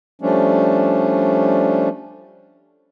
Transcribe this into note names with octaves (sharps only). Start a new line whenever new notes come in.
F3 G3 A3 C#4 D4